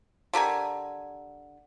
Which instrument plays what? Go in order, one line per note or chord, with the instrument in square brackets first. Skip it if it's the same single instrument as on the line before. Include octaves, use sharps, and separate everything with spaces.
[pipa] D3 G4 A#4 G#5